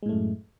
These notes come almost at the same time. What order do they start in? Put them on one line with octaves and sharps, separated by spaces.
G#3 A2 A3 F#2